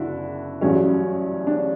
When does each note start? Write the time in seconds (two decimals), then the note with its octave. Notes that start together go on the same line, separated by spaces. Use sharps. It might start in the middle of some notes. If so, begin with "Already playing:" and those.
Already playing: F#1 D4 E4 F#4
0.61 A1 G2 F#3 C#4
1.47 D4